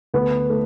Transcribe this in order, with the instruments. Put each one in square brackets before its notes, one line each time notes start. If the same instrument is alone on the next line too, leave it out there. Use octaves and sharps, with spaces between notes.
[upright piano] D2 [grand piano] B3
[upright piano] A3